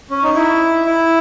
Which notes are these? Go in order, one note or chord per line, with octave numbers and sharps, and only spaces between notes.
C#4
D#4
E4
E4